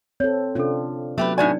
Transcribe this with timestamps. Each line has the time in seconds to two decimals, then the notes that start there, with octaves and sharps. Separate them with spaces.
0.20 C4 A4 C#5
0.55 C3 C#4 D4 F4 A4
1.18 F#3 A3 B3 G4 B4
1.38 A2 D4 D#4 F#4 D5 G#5